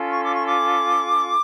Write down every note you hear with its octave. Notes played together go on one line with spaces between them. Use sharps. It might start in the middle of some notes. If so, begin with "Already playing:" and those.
Already playing: C#4 F4 A4
C#6
D6
C#6
D6